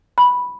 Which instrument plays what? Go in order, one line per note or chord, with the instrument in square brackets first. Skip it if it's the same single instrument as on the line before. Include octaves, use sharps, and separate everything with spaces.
[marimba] B5